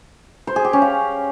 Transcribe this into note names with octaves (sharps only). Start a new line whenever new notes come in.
C5
G#4
G4
C#4
F5